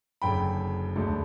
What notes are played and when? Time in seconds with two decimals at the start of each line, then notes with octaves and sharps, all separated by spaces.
0.22 F#1 F#2 D3 G5 B5
0.95 E1 D2 D3